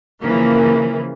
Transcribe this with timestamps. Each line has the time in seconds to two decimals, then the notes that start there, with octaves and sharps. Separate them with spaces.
0.23 C#3 E3 F3 A#3